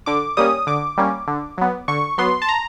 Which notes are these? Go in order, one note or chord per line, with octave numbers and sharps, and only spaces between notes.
D3 D6
G3 A#3 C#4 D#6
D3 D6
G3 A#3 C#4
D3
F#3 B3
D3 C#6
F#3 B3 C6
A5
A#5